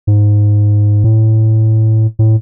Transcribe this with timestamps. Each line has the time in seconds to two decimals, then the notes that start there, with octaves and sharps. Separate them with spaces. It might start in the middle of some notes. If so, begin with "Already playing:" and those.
0.07 G#2
1.04 A2
2.19 A2